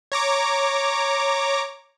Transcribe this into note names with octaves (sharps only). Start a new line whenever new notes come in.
C#5 A#5 D6